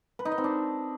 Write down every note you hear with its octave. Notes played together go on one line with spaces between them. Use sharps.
B4
D#4
D#5
C4
D4